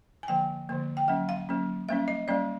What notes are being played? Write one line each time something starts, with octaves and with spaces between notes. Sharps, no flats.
G#5
D3 F3 A#3 G5
D3 F3 A#3
G5
F#3 A#3 C#4 F#5
F5
F#3 A#3 C#4
G3 A#3 C#4 E5
D#5
G3 A#3 C#4 D5